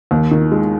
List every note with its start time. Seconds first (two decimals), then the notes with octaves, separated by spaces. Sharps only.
0.11 D#2
0.31 D#3
0.52 G#3